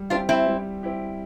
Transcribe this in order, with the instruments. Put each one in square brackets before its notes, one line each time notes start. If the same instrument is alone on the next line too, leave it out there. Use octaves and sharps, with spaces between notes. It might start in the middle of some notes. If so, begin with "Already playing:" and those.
Already playing: [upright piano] G3
[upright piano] C4 E4 G4 [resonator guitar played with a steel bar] D4 F4
[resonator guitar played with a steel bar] C4 E4
[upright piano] G3
C4 E4 G4